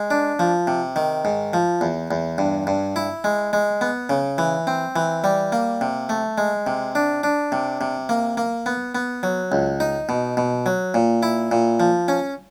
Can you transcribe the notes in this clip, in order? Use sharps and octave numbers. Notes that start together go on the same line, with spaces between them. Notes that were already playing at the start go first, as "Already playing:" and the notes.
Already playing: G#3
D4
F3
C3
D#3
G#2
F3
E2
E2
G2
G2
E4
G#3
G#3
B3
C#3
E3
C4
E3
G3
A#3
C3
A3
G#3
C3
D4
D4
C3
C3
A#3
A#3
B3
B3
F#3
C#2
D#4
B2
B2
F#3
A#2
E4
A#2
F3
C#4